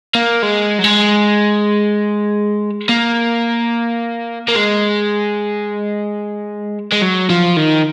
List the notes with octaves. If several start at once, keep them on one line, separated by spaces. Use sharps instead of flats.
A#3
G#3
F#3
G#3
A#3
A#3
G#3
G#3
F#3
F3
D#3